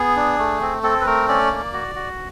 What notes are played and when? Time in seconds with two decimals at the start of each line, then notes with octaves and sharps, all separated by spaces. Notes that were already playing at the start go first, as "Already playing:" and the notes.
Already playing: B3 G#4
0.16 D4
0.39 A3
0.61 C4
0.83 C4 A4
1.01 B4
1.06 A3 A#4
1.28 C#4 D5
1.50 A#3
1.73 F#4
1.95 F#4